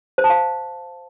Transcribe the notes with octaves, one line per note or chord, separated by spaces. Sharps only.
C5
A5
F5